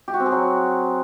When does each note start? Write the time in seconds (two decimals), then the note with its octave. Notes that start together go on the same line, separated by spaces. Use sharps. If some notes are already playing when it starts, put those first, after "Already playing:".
0.08 G4
0.14 F#4
0.20 C4
0.26 G#4
0.32 F#3